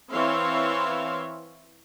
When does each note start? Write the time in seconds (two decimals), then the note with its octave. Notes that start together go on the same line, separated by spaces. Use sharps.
0.11 E3 C4 C#5 E5 F5 C6